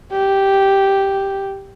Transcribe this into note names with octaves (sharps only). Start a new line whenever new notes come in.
G4